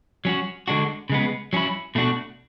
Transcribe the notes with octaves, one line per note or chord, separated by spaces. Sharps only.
F#3 C#4 F#4
D3 G#3 D4 F#4
C#3 G#3 B3
F#3 C#4 E4
B2 A3 D4 F#4